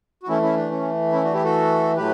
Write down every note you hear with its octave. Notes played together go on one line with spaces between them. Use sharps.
F#4
E3 A3 C#4 E4
C#4 E4
D4
C#4
C#4 E4
D4 F#4
E4 G4
F#4 A4
A2 F#3 A3 G4 B4